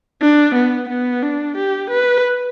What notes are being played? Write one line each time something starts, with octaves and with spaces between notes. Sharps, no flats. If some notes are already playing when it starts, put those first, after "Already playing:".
D4
B3
B3
D4
G4
B4